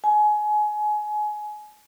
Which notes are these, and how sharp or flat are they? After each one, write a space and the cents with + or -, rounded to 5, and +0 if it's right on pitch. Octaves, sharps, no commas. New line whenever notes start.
G#5 +25